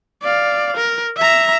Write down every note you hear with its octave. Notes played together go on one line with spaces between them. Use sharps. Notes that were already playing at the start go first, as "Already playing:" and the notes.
D5 F5
A#4
E5 A#5